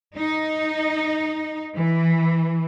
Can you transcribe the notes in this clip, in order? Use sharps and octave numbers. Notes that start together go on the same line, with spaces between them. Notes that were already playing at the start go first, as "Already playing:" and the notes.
D#4
E3